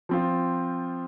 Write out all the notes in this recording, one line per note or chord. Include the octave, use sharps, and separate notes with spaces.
F3 C4 F4